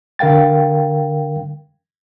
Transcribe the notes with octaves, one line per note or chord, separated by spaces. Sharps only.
D3 A#4 F5 G5 A6